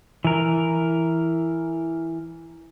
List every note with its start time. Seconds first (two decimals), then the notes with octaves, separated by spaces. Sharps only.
0.24 E3 A#4